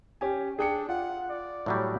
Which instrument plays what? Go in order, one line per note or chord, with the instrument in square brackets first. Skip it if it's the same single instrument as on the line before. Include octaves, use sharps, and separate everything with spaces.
[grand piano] C#4 G4 G#5
[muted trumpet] D4 [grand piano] G#4 G5 C#7
[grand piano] F4 [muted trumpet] F#5
[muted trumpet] D5
[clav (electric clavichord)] A2 F#3 G3